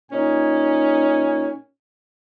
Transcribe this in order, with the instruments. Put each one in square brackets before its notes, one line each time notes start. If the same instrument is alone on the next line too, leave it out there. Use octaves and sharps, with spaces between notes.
[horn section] A#2 C#4 D#4 G#5